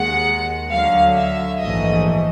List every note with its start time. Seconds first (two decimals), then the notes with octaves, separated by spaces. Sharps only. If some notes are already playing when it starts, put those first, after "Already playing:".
Already playing: D#2 D#3 G#3 F#5
0.70 D2 D3 F#3 F5
1.15 E5
1.60 A#1 G#2 E3 A3 D#5